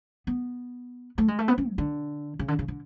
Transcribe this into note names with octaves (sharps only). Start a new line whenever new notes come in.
B3
A3
G#3
A3
B3
C#4
F#3
D3
C#3
D3
C#3
D3